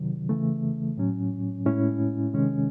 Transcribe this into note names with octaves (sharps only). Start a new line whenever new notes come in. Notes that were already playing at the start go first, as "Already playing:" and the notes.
Already playing: C3 D#3 F#3
C#3 E3 A3
A2 F#3 C#4
A2 G#3 C#4 E4
C3 D#3 G#3 C#4